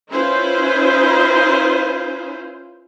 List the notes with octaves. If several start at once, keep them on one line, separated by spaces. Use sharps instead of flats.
C#4 E4 F4 B4 C5